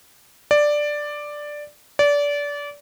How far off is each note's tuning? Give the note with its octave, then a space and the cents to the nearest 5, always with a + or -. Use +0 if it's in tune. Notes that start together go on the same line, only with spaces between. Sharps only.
D5 +5
D5 -25